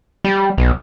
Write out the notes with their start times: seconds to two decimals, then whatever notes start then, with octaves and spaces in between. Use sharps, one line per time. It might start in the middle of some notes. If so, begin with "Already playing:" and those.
0.24 G3
0.58 B1